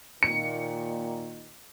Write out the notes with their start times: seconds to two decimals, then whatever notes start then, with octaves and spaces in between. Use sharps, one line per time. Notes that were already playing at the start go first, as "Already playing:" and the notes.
0.23 A#2 D#3 C#7